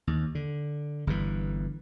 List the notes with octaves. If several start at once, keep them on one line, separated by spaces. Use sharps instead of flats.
D#2
D3
G1 G2 E3